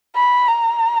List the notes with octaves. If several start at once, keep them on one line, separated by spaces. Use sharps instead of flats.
B5
A#5